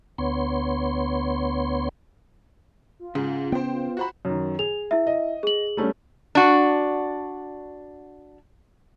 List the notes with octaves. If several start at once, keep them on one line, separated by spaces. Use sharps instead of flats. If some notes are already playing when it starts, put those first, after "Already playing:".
D2 B3 C#5 C6
F4
G#2 C#3
B3 C5 G5
F4
F#4 C5 B5
F#2 D#3
G#4 F7
E4 E5
D#5
G#4 F#7
G3 A3 C#4
D4 F#4